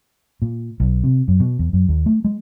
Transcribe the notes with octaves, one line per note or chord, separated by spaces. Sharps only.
A#2
B1
C3
F#2
B2
E2
F#2
D#2
A3
G#3